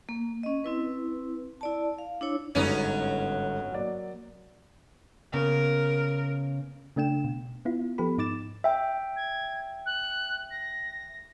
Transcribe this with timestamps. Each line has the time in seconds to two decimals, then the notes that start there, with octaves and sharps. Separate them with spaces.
0.09 A#3
0.43 C#4 D#5
0.64 C4 E4 B4
1.61 E4 D5 A5
1.98 F5
2.21 D4 E4 C#5
2.55 G1 G#2 F#3 B3 C#4 D#7
3.72 F#3 A#3 D5
5.33 C#3 A#3 B3 A#4
6.96 C#3 A3 D4 G5 E7
7.24 B2
7.65 B3 E4 F4
7.98 F3 B3 G4 A4 B5
8.18 G#2 D#4 D6 A6 E7
8.64 E5 G5
9.16 G#6
9.86 F#6
10.51 A#6